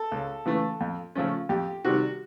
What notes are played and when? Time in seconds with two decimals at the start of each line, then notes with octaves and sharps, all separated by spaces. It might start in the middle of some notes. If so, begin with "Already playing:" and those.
Already playing: A4
0.12 C#2
0.46 C#3 E3 A3
0.81 F2
1.15 C#3 F3 A3 C#4
1.49 F2 G4
1.85 C3 D#3 G3 F#4